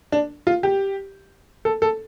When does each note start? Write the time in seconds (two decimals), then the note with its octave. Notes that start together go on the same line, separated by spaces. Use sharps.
0.12 D4
0.47 F4
0.63 G4
1.65 A4
1.82 A4